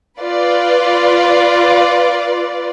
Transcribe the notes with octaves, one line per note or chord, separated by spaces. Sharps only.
F4 B4 D5